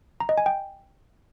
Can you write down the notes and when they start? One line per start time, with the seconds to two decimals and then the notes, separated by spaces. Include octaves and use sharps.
0.20 A#5
0.29 D#5
0.38 G#5
0.46 G5